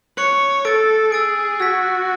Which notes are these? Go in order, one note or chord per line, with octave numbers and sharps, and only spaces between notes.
C#5 F#6 C#7 F#7
A4 E6 A6 D7
G#4 E6 A6 D7
F#4 E6 G#6 B6